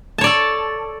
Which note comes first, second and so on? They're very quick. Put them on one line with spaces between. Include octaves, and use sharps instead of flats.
A5 C#5 D5 A4